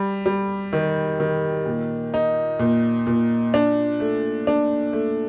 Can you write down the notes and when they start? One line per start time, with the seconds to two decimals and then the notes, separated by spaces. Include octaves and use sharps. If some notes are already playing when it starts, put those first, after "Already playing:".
Already playing: G3
0.26 G3
0.73 D#3
1.20 D#3
1.66 A#2
2.14 D#4
2.59 A#2
3.07 A#2
3.54 D4
4.00 A3
4.47 D4
4.93 A3